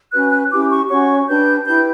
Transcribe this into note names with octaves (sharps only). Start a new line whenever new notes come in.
C#4 F#4 B4 F#6
F#6
C#4 E4 G4 D6
C#6
C#4 F#4 C#5 C#6
D4 G4 B4 G6
E4 G4 B4 G6